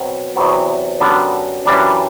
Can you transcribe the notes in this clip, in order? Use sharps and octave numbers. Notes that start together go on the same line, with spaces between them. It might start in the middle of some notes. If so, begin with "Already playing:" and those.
Already playing: B2 F#3 C4
E2 C3 F#3 B3
F#2 D3 G3 B3 D4
F#2 E3 G3 D4